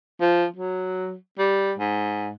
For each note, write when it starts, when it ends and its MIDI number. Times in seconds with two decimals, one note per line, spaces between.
0.21 0.46 53
0.57 1.16 54
1.39 1.73 55
1.79 2.30 44